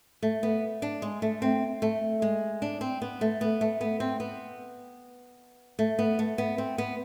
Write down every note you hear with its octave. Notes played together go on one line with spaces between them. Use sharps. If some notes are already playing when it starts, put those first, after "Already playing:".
A3
B3
D4
G#3
A3
C4
A3
G#3
D4
C4
B3
A3
B3
A3
B3
C4
B3
A3
B3
A3
B3
C4
B3